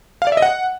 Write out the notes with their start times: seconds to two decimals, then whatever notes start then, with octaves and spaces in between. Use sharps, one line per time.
0.22 F5
0.27 D5
0.32 E5
0.37 D#5
0.42 F#5